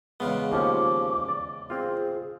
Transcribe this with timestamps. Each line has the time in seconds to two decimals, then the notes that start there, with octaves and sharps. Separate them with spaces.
0.20 E2 C#3 G#3 B3 F5
0.52 D#2 F3 C#4 D6
1.28 D5
1.70 C4 F4 G#4